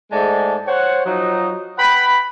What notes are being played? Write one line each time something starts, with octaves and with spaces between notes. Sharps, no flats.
G#2 G#3 A3 D5 A5
C5 C#5 F#5
F3 F#3 D#4
B4 F#5 G5 B5